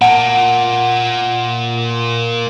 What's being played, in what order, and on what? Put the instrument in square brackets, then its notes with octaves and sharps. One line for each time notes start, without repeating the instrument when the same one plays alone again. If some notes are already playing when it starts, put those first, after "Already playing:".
[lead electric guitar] A#2 A#3 [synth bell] F#5